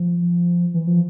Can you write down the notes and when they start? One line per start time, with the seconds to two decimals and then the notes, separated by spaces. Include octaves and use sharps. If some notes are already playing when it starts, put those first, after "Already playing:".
Already playing: F3
0.74 E3
0.87 F3